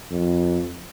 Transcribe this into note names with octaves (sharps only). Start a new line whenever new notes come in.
F2